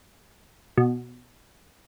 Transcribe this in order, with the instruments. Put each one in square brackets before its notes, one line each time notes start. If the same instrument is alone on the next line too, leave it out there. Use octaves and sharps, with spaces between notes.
[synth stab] B2